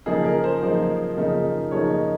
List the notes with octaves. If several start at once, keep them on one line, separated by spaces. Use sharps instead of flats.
C#3 F3 A#3 D#4 G#4
A#4
C5
C#3 F3 A#3 D#4
C#3 F3 A#3 D#4
C#3 F3 A#3 D#4 C#5
D#5